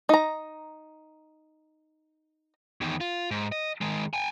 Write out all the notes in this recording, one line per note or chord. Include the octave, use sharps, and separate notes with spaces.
D#4 A#5
E2 D#3
F4
G#2
D#5
D#3 G#3
G5 G#5